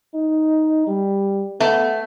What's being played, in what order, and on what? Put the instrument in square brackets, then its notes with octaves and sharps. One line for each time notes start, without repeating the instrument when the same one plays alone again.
[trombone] D#4
G3
[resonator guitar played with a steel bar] A3 [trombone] B3